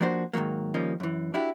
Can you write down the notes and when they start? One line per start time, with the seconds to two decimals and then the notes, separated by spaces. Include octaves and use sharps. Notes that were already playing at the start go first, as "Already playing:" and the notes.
0.01 F3 A#3 D4 F#4 C5
0.33 G#2 D#3 E3 F#3 A#3
0.74 D#3 F3 G3 A#3 C#4 D#4
1.00 F#2 E3
1.34 D4 E4 F#4 G4